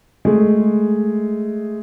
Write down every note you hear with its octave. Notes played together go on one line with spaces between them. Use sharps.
G#3 A3